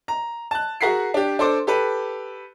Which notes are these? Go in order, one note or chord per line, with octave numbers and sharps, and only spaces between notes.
A#5
A5 F#6
F#4 G#4 A#4 F#5 B6 C7
D4 G4
D4 A4 C5 D6
G4 A4 B4